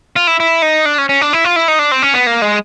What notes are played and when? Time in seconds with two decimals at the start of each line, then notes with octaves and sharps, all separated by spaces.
0.16 F4
0.27 E4
0.40 E4
0.62 D#4
0.85 D4
0.98 C#4
1.09 C#4
1.21 D4
1.33 E4
1.44 F4
1.56 E4
1.68 D#4
1.79 D4
1.92 C4
2.02 C#4
2.14 B3
2.27 A#3
2.42 G#3